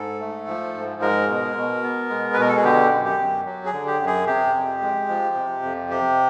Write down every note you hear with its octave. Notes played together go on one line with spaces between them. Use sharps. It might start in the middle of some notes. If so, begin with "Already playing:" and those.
Already playing: G#2 A4
A3
F3
G#2
G#3 A#4
B2
B2
B3
G#3
B4
B2 A#4
A4
G#4
D3 G4
F#2
G4
F#2
F#3
G#4
D3
G4
F#2
G#4
C3 G4
F2
G#3
F3
C3
F2
C3 G4